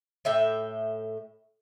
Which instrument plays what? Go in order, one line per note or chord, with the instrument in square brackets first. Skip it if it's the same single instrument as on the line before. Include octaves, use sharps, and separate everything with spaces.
[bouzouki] A2 E5 G5